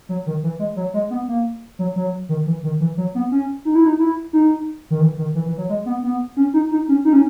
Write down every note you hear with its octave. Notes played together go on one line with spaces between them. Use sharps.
F#3
D#3
E3
G#3
F#3
G#3
B3
A#3
F#3
F#3
D#3
E3
D#3
E3
F#3
B3
C#4
D#4
E4
D#4
E4
D#4
D#3
E3
D#3
E3
E3
F#3
G#3
B3
B3
C#4
D#4
D#4
C#4
D#4
C#4